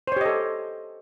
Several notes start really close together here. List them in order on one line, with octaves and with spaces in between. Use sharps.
C5 C#5 G4 D#5 A4